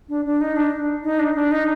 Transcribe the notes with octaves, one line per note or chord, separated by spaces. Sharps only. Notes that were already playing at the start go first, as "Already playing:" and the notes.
D4
D4
D#4
D4
D#4
D4
D4
D#4